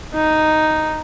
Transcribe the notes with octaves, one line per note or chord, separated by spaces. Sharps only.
D#4